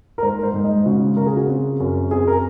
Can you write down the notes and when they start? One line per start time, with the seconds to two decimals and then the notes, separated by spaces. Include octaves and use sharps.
0.18 A#4
0.23 G#2 C5
0.39 A#4
0.43 C5
0.54 G#2
0.64 D#5
0.86 C#3 F#4
1.17 C#3 A#4
1.27 G#4
1.36 F#4
1.45 C4 G#4
1.80 F#2
2.11 C4 G#4
2.27 A#4